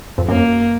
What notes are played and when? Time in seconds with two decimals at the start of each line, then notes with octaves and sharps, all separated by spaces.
0.18 F2
0.28 F#2 A#3